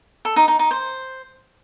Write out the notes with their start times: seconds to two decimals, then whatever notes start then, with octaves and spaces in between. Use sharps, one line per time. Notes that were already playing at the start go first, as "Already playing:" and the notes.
0.25 A4
0.36 D#4
0.48 D#4
0.59 D#4
0.71 C5